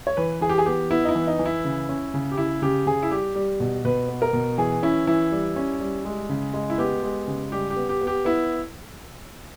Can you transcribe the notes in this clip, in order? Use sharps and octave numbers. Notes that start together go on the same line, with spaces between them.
C#5
E3 B4
E3 G#4
G4
G#4
B3 G4
B3 E4
D#4
E4
E3
D#4
E3
E4
C#3
C#4
C#3
G4
C#3 E4
C#3 G4
C#3 G#4
E4
G3 G4
G3
B2
B2 B4
B3
A#4
B2
E3 G#4
C#4 E4
E3 E4
G3
C#4
G3
G#3
C#3
G#3
E4
B3 G4
G#3
C#3
G3 G4
G4
B3
G4
B3
G4
B3 E4